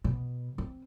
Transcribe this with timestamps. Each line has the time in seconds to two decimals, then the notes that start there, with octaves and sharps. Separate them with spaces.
0.04 B2
0.58 C4